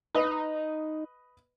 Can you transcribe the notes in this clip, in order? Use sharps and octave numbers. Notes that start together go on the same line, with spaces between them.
D#4 B4 D#5